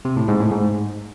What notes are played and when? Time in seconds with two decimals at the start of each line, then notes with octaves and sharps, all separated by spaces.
0.05 C3
0.17 A2
0.28 G#2
0.40 A2
0.52 G#2